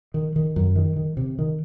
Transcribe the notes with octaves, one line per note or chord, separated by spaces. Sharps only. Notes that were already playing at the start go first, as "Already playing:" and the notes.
D#3
D#3
F#2
D#3
D#3
C3
D#3